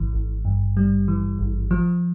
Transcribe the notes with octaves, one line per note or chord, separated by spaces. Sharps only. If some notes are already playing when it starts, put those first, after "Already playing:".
Already playing: G#1 G#2 E3
G#1
G2
G3
E3
G#1
F3